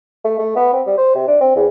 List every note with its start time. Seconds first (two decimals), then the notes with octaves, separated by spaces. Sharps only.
0.24 A3
0.39 A3
0.56 B3
0.73 C4
0.87 G3
0.98 C5
1.15 C3
1.28 D4
1.41 C4
1.56 E2